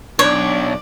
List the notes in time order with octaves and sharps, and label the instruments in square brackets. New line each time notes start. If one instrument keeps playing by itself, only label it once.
[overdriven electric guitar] B1 [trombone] D4 [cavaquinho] C#5 [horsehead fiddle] D5